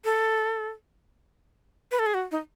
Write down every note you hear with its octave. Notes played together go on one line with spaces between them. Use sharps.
A4
B4
A4
G#4
F#4
D#4